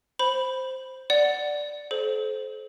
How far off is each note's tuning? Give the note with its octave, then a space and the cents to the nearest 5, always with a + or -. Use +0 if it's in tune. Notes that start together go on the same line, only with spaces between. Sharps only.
C5 +0 B5 +0
D5 +0 F#5 +5
A4 -35 C5 +0